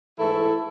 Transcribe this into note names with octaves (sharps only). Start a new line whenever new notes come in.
G#2 E3 A3 E4 A4